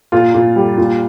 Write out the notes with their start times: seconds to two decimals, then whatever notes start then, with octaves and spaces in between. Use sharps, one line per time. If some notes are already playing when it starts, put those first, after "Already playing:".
0.12 A#2 F4
0.34 A#2
0.56 G3
0.78 A#2